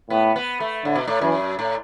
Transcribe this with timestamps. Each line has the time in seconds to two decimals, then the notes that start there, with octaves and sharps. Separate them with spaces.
0.10 A2 B3
0.36 B3
0.60 A3
0.85 A2 D3
0.95 B2
1.07 A2
1.21 F#2 E3
1.59 A2